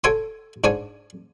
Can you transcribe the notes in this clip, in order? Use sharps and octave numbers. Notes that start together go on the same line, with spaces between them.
A4 C#5 G5 G#5 C6
G#2 D4 C#5 G#5